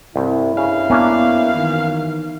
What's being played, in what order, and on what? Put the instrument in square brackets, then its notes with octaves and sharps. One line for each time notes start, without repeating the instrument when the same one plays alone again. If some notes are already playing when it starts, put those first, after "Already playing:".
[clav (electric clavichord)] C2 [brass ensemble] G2 E4
[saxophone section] F#2 F5 [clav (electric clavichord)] C#3
[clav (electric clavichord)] A#3 C#4 D4 [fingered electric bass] B3
[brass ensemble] D#3 E3